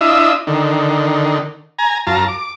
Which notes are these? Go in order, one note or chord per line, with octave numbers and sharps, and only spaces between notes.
D4 E4 F4 D#5 E5
D3 D#3
G#5 A#5
F#2 F4 A5 A#5
D6